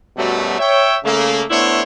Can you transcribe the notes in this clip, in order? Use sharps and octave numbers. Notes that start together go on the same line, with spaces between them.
F#2 B2 F#3 G3 A3
C#5 E5 G5
C#3 A3 A#3
A3 B3 D4 E4 C5 C#5